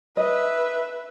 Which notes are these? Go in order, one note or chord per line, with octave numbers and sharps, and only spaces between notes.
B4 D#5 E5